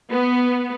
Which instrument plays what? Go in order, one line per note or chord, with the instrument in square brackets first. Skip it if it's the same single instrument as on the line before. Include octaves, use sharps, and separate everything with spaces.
[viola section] B3